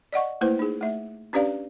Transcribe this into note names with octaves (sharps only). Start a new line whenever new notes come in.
D5 D#5 F#5 C#6
A3 A#3 E4 B4 C5
D#4 G#4
A3 E5
C#4 D4 G4 B4 D5 F5